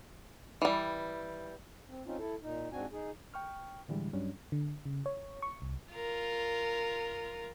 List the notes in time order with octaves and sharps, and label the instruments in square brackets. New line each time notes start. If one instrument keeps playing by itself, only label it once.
[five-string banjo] E3 G3
[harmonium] C4
C4 C#4 D#4 F4
E4 A4
A#2 D#4
G#2 C4 D4 F#4 G#5
D#4 G#4
[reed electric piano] G5 C#6 F6
A2 D3 E3 G3 G#3
G2 F#3 G3 C#4 D4
[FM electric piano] D3
C#3
C#5
C#6
C2
[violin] F4 A#4